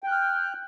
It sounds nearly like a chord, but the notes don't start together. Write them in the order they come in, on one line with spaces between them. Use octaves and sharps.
G5 F#6 F6